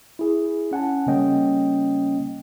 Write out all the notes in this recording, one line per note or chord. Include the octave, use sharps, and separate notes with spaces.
E4 G#4
C#4 F#5 G#5 A5
C#3 G3 A#3 C#4 D#5 G5